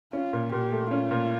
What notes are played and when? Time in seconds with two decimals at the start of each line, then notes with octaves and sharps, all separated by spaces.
0.13 C#4 F4
0.33 A#2
0.52 A#2 G4
0.72 A3
0.91 C#4 F4
1.11 A#2